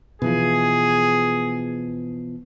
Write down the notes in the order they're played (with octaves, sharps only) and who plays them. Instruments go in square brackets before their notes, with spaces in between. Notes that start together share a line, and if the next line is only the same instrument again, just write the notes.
[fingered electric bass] B2 E3 F3 [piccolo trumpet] G#4